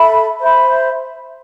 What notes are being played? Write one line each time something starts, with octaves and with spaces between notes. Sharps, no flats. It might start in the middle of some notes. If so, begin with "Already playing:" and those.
Already playing: A4 E5 B5
C5 E5 B5